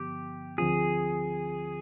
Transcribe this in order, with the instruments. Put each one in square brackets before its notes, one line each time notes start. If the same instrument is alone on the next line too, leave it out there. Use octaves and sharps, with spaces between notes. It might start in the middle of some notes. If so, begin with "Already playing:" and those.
Already playing: [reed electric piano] G2 D3 F3 B3 [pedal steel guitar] G4
[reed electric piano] D2 D3 F3 C4 F4 [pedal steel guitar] G#4